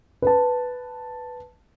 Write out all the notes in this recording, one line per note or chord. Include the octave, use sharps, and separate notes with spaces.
B4 A5